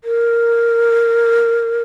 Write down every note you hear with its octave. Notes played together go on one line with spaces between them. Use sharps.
A#4